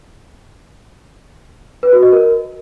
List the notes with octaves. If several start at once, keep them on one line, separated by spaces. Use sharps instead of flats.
B4
F#4
D#5
A#4